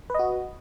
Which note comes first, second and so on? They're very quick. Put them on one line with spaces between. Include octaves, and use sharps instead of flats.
B4 D#5 F#4